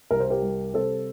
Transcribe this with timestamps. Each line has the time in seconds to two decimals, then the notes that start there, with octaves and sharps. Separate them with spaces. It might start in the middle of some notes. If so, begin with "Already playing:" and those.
0.11 C2 A#4
0.20 C5
0.30 G4 A#4
0.42 G3
0.74 C3 A4 C5